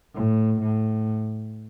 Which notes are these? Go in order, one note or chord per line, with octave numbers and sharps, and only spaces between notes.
A2
A2